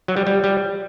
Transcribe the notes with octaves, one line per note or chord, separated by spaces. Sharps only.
F#3
G3
G3
G3